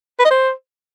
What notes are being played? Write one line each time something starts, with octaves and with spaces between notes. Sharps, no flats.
B4
D#5
C5